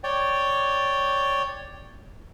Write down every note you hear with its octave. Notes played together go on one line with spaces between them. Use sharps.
C#5 D5 G5